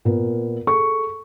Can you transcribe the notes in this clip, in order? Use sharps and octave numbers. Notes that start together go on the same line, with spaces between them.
A#2 B3 A#4
G#4 A4 C#6